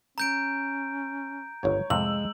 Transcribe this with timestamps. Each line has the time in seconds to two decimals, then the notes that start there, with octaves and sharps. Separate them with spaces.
0.18 C#4 A#5 G6 D7
1.63 G1 C#2 G#2 C#5
1.90 F2 A2 C3 G#3 E6 F#7